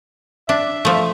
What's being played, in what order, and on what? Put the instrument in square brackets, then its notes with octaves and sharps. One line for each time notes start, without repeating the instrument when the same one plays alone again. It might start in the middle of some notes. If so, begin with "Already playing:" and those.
[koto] D4 [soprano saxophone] E5
[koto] F3 A3